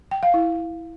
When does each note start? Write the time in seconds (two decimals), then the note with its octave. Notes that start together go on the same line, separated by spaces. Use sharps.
0.11 G5
0.23 F5
0.34 E4